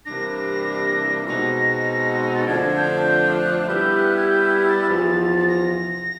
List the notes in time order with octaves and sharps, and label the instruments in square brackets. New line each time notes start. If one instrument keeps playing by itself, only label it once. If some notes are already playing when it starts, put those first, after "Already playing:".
[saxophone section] C3 E3 G3 A#3 D4 [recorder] A#6
[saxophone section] B2 G#3 C4 D#4 F#4 [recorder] A#6
[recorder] A6
[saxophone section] F2 D3 F3 A3 D4 [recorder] G#6
[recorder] G6
G6
F#6
[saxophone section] G3 B3 E4 G4 B4 [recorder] G6
[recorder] F#6
G#6
G6
G#6
A6
[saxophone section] E2 C3 F3
[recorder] A6
A#6